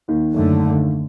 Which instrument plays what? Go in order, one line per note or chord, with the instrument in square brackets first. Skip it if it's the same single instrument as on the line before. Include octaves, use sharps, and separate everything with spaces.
[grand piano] D#2 D#3
[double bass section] F#2 D3 A3